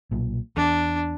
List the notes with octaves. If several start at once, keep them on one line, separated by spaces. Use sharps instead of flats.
B1 A#2
E2 D4